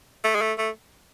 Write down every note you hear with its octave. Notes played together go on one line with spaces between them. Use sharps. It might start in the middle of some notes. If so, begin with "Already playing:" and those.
A3
G#3
A3
A3